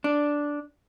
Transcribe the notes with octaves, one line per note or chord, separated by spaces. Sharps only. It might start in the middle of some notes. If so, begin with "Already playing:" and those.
D4